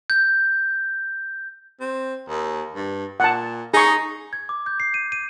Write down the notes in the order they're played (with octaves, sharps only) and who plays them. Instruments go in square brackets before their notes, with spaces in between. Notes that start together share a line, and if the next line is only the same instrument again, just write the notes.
[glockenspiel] G6
[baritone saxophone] C4
D#2
G2
[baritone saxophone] A#2 [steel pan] F#5 A5
[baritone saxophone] D#4 [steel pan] G#4 C#6
[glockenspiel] G#6
D6
G6
C7
D#7
D#7